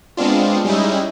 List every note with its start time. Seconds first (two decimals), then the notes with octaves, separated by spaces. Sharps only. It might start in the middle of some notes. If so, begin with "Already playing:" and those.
0.17 G#3 B3 C4 D4 F4
0.65 G3 G#3 C#4 D#4 E4